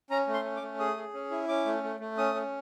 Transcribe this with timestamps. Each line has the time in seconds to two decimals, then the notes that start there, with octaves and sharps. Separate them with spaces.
0.10 C#4 A#5
0.27 A3
0.34 C6
0.44 C#4
0.56 D6
0.62 A3
0.79 G#4 D#6
0.97 G#4
1.14 C#4
1.31 E4
1.49 C#4 D6
1.66 A3
1.83 A3
2.00 A3
2.18 C#4 D#6
2.35 C#4